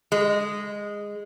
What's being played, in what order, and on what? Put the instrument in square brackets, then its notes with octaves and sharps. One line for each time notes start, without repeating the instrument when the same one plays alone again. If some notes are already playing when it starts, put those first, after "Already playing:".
[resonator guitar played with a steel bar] G#3